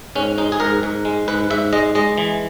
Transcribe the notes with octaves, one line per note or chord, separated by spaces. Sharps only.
G#2 C#4
G#3 D#4
G#4
G#2 A#4
G#2
G#3
G#2 B4
G#2 E5
G#3 D#5
G#3 D#5
E3